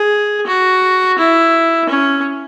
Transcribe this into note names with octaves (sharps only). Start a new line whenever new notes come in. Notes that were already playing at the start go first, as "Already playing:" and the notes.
Already playing: G#4
F#4
E4
C#4